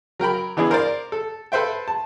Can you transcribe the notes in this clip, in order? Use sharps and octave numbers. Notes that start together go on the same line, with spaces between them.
F#3 A#4 G5 B5
E3 B3 D4 E4 G#4
A#4 C5 D5
A4
A4 B4 C5 E5 G5
A5